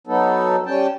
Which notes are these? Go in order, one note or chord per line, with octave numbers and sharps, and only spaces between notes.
F#3 B3 D#4 A4
G3 C#4 G5 A5